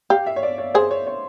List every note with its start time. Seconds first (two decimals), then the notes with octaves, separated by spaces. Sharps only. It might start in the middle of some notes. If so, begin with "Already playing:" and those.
0.10 G4 F5
0.26 E5
0.36 C#5
0.43 D5
0.58 C#5
0.74 G#4 C5
0.91 C#5
1.07 C#5